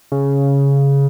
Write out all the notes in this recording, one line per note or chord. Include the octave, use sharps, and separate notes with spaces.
C#3